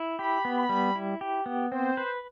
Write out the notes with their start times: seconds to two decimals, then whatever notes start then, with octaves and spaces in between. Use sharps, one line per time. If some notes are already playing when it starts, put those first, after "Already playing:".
Already playing: E4
0.19 G4 B5
0.45 B3
0.56 B5
0.69 G3
0.96 E4
1.21 G4
1.46 B3
1.72 C4 C5
1.97 B4